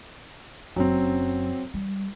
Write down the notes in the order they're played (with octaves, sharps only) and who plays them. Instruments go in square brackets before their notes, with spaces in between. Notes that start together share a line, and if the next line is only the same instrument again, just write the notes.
[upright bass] F#1 F#2 [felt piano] F#3 C4
[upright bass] G3